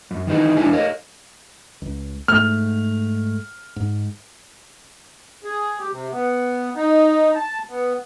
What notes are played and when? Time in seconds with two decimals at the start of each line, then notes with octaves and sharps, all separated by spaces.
0.11 F#2
0.27 D#3 E3 D#4 G#4
0.57 E2 D4 E4 G#5
0.73 A#4 C#5 D#5
1.82 C#2
2.28 G#2 A3 F6
3.76 G#2
5.44 G#4
5.79 G4
5.91 C3
6.12 B3
6.76 D#4
7.35 A5
7.70 B3